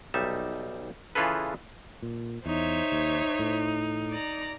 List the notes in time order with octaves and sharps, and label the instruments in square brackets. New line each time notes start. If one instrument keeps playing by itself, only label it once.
[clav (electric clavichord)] B1 G3 D#4 E5 A5
C#3 E3 F4 G#4 A4 B4
[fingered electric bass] A#2
[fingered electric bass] E2 [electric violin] D#4 [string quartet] C5 C#5 E5
[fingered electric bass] D#2
A2
[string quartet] D5 A#5